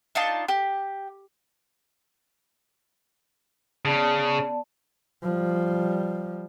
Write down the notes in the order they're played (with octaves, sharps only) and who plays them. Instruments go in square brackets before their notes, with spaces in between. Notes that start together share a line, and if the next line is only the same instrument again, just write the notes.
[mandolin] D4 D#4 F4 A5
G4
[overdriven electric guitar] C#3 [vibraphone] B3 D5 A5
[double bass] F3 G3